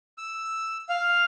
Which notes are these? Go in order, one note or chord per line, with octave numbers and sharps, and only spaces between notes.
E6
F5